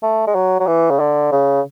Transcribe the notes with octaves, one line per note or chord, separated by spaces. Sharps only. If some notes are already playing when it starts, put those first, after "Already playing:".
A3
G#3
F#3
F#3
E3
C#3
D3
C#3